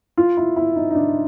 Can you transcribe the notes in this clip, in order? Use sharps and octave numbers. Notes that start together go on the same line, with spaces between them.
F4
E4
E4
D#4
D#4
D4